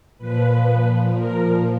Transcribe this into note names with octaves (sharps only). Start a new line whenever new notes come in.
A#2 F3 B4
A#4